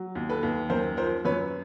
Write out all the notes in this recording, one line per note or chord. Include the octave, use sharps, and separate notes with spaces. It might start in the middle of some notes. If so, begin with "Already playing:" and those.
Already playing: F#3
D#2
A4 B4
D#2
F#2 A#4 C5
F3 A#4 C5
F#2 B4 C#5